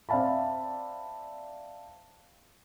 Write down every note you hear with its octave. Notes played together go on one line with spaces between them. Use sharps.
C4 D5 E5 F5 A5 B5